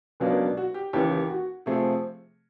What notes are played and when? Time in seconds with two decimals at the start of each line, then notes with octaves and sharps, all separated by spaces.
0.20 C#2 B2 F#3 A#3 D4
0.57 F#4
0.74 G4
0.93 D#2 C#3 E3 G4
1.12 G4
1.30 F#4
1.66 C3 F3 A3 C4 G#4